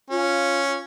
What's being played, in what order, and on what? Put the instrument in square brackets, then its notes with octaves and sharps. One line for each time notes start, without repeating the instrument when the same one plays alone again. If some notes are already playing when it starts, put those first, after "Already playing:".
[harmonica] C#4 [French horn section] F4